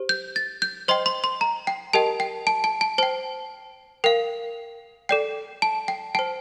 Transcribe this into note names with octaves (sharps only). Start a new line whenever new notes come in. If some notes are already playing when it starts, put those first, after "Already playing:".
Already playing: G4 C5
G6
A6
G6
C5 D#5 G5 C6
C6
C6
A#5
G5
G4 A#4 D#5 G5 A5
G5
A5
A5
A5
C5 G5 A5
A#4 F5 G5
A4 D5 G5
A5
G5
C5 G5 A5